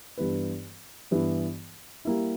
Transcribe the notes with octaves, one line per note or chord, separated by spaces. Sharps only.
G2 E3 B3 E4 B4
G2 E3 B3 E4 B4
G3 A#3 E4